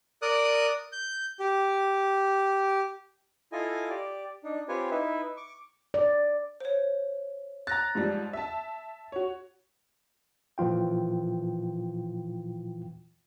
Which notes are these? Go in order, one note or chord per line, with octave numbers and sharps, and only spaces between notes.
A#4 D5 D#6 F#6
G6
G4
E4 F4 A4 D#5 G#5
G4 D5
D4 D#4
C4 F4 G4 B4 C#5 G#5
D#4 E4 B4 E5
C#6 D6
D5
C5 C#5
A#5 F#6 A6 A#6
G#2 F3 G3
E5 A5
F#4 C#5
A#2 E3 F3 F4 G5